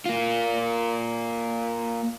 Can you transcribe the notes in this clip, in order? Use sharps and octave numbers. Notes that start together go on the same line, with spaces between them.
A#3 F4